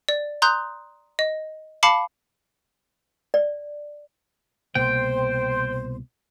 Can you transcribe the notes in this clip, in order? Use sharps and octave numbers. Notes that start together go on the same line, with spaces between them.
D5
A#5 C6 D#6 F#6 G6
D#5
F5 A5 B5 D6 C7 C#7
D5
C2 B2 A#3 C5 G5